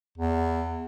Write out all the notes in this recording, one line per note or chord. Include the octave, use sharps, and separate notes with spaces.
E2